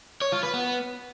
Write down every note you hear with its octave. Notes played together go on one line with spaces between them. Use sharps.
C#5
F4
B4
B3